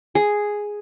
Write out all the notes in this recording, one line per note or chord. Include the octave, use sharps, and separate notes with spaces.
G#4